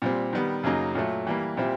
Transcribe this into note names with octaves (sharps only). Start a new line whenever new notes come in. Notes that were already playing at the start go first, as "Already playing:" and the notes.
A#2 G3 C4
D#3 G3 B3
F#2 C#3 F#3 A#3 D#4
A#2 F#3 A3
E3 G3 A#3
A#2 G3 C4 E4 G4